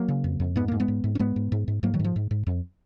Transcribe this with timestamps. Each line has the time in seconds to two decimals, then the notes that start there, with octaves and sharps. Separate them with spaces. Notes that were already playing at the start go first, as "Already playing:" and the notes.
Already playing: F#3 A#3
0.08 C#3
0.24 F2
0.40 F2
0.56 G#2 B3
0.68 G#2 A#3
0.80 G#3 B3
0.88 G#2
1.04 G#2
1.15 C#4
1.19 G#2 G#3 B3
1.36 G#2
1.52 G#2
1.68 G#2
1.83 G#2 F#3 A#3
1.94 D#3 F#3
1.99 G#2 F3
2.16 G#2
2.31 G#2
2.47 F2